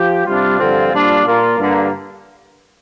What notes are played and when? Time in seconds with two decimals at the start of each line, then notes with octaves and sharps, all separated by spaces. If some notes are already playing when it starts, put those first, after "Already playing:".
Already playing: F3 G4
0.25 C3 G3 D4 F4
0.59 G2 D3 F3 C4 F4
0.92 A#2 G3 A#3 D4 F4
1.26 A#2 A#3 F4
1.58 G2 D3 A#3